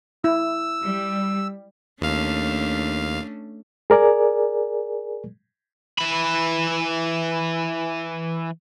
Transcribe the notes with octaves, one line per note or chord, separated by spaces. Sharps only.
E4 E6
G3
D#2 A3 C#4 D4 F5
G#4 A#4 D5 G#5
E3 B5